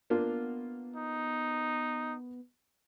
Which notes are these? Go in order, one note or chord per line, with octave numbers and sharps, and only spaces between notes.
A#3 B3 D4 F4
D#4